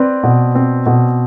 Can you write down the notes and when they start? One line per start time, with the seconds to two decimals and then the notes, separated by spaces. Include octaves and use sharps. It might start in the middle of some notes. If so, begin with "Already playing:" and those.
Already playing: C4 B4 D5
0.23 B2
0.55 C4
0.86 B2